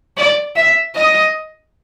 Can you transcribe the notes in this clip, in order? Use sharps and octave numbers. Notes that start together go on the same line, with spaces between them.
D5
E5
D#5